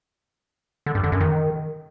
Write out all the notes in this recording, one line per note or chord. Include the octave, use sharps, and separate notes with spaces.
D3
G2
D3
F#2
D#3